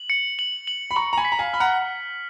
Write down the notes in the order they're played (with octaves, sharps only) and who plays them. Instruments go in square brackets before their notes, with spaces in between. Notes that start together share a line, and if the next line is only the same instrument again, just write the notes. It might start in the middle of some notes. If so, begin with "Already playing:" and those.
Already playing: [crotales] F#7
C#7
F#7
F#7
[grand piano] B5
[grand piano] A#5 C#6 [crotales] F#7
[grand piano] A#5
G#5 B5
[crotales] B6
[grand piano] A#5
F5 G#5
[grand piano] B5 [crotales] F6
[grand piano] F#5 A#5